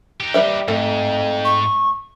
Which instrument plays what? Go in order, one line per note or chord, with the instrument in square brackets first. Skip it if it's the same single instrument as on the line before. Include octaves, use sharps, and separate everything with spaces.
[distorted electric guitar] D#4 G4
[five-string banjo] G3 B4 E5
[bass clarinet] F2 [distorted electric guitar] G#2 [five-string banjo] A3
[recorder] C#6